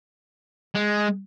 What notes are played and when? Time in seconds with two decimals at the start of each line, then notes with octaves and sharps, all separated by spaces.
0.75 G#3